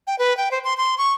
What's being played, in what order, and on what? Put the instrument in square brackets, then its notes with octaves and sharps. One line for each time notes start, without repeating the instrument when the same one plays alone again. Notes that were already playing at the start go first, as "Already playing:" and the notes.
[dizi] G5
B4
G5
C5
C6
C6
C#6